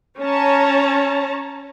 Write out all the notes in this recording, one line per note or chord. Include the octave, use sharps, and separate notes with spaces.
C#4 C#5 A5 A#5